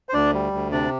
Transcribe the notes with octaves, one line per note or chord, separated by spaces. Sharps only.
C5
D2 D4 D5
G3
D2
C3 D4 D5